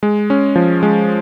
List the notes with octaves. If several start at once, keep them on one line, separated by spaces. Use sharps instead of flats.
G#3
C#4
F3
G#3